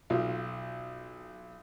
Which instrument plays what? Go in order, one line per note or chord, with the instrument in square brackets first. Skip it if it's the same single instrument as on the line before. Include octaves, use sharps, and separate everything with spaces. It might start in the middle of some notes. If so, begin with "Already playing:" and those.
[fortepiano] B1 F4